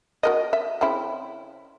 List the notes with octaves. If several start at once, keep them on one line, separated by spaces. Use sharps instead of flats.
F#4 A#4 D#5
E5
C#3 C4 E4